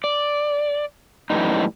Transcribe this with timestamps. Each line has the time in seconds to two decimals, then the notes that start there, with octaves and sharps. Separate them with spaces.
0.04 D5
1.30 F#2 A2 C3 E3 G3 D#4